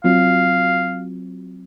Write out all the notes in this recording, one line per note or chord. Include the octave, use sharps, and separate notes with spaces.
F#3 C4 F4 F5